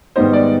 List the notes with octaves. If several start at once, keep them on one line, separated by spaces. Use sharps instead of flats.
G#2 D#3 G3 B3 D#4 C5
D5